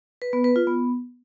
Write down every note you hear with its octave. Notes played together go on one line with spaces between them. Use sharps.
B4
B3
B4
F4
B3